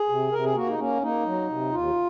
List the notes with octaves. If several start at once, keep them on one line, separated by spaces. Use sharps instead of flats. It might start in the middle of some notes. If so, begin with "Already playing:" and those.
Already playing: G#4
C3
C3 A#4
G#4
A#3 F#4
D#4
A#3 C#4
A#3 D#4
F#3
C3
D#2 F4